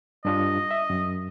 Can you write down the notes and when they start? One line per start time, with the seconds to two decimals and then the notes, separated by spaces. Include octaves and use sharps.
0.25 G2 D4 F4 D#5
0.71 E5
0.90 F#2